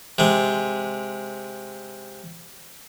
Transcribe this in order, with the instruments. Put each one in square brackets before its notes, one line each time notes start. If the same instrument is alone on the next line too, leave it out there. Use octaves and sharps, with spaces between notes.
[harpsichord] C3 G#3